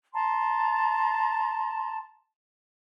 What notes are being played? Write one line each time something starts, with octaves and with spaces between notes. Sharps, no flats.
A5 A#5 C6